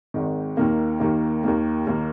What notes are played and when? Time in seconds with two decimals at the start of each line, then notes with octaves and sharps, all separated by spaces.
0.14 G#1 G#2 D#3
0.57 D#2 D#3 A#3
1.00 D#2 D#3 A#3
1.44 D#2 D#3 A#3
1.87 D#2 D#3 A#3